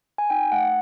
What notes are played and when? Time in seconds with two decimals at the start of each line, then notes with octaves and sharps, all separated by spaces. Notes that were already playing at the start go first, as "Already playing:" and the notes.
0.18 G#5
0.30 D#4 G5
0.52 A3 F#5